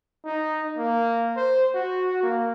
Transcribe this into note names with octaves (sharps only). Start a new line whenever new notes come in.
D#4
A#3
C5
F#4
A#3